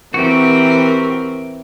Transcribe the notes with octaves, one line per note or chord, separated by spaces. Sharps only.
E3 C4 F#4 G4 A#4